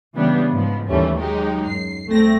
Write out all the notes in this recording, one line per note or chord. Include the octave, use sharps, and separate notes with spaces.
C#3 E3 G3 B3 D4
G#2 F3 B3
D#2 E3 G3 A3 C#4
F#3 G#3 D#4 G4
F#2 C7
C2 A3 C4 A#6